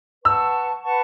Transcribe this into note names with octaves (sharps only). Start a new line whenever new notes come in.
B4 F#5 A5 C#6 E6
B4 F#5 A5 C#6